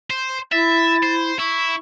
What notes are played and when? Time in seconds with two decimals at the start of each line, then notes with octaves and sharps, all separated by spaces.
0.10 C5
0.52 E4 E5 A6
1.03 C5
1.39 E4 C#6